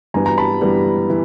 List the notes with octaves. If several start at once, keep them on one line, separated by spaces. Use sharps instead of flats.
G2 E3 G3 B3 G#5 A#5
A#5
A5 B5
G2 E3 G3 B3
E3